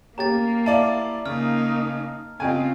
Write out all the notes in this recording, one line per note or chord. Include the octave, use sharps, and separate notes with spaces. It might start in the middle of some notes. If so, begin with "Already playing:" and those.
A#3 C#4 G4 A#5 A6
E4 D5 F5 A5
C#3 A#3 D#4 F6
C#3 C4 F4 D#5 G5 G#5